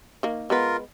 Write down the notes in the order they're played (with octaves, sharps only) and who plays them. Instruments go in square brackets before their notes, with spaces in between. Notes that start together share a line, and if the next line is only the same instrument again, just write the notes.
[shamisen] D#3 A#3
[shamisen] G#3 B3 B4 [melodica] F4 A#4